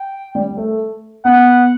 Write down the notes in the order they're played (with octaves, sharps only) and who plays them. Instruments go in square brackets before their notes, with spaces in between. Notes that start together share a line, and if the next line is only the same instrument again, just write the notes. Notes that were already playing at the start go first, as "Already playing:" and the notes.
Already playing: [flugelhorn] G5
[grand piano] G3
A3
[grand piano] B3 [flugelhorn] F#5